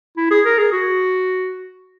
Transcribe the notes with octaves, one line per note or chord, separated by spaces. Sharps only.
E4
G#4
A#4
G#4
F#4